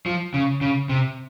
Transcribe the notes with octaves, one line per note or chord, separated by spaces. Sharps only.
F3
C#3
C#3
C3